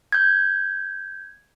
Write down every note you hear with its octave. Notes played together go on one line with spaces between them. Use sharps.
G6 G#6